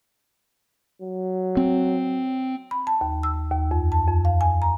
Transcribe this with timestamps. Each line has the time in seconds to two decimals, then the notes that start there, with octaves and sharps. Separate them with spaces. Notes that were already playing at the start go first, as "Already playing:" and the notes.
1.01 F#3
1.57 C4
2.71 B5
2.87 A5
3.01 D#2
3.23 E6
3.52 D#2
3.71 F2
3.92 A5
4.08 F2
4.25 F5
4.41 G#5
4.62 A#5